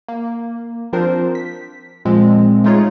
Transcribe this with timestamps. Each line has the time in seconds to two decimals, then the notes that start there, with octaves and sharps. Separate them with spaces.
0.08 A#3
0.93 F3 C4 D4 F4 A#4 C5
1.35 B6
2.05 A#2 F3 G#3 C4
2.64 G#3 A3 D#4 F4 G#4 C#5